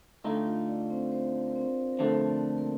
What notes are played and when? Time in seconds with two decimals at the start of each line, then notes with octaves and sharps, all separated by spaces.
0.24 D3 A3 D#4 F4 F5
0.36 G5
0.46 F4 F5
0.68 D4 D5
0.90 C4 C5
1.12 C4 C5
1.47 A#4
1.55 C4 C5
1.93 A#4
1.99 D3 F3 A3 C4 C5
2.29 D4 D5
2.58 A#3 A#4